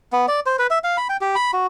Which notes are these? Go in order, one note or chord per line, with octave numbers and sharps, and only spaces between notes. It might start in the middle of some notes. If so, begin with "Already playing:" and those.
B3
D5
C5
B4
E5
F5
B5
G5
G4
B5
F#4